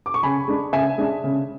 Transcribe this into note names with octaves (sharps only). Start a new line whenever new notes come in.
D6
C#6
C#3 G#5 B5
G#3 D4
C#3 E5 G#5
G#3 D4
C#3